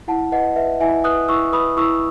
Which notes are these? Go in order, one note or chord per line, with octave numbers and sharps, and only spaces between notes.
E4 F#5 A5
B4 D#5 F#5
B4 E5
E4 E5 G#5
B4 D#6 F#6
E4 C#6 E6
B4 B5 D#6
E4 C#6 E6